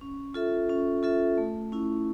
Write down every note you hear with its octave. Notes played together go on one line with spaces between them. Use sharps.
C#4
F4 A4 E5
C#4
F4 A4 E5
A3
C#4 E4